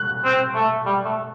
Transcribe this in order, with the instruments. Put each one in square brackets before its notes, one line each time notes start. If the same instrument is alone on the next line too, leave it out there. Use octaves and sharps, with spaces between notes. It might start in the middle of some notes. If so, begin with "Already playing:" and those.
Already playing: [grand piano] F#6
[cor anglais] C4
A3
G3
A3